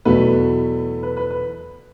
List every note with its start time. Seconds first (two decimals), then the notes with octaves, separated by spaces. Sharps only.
0.05 E2 B2 F#3 A3 B4
1.03 B4
1.17 B4
1.31 B4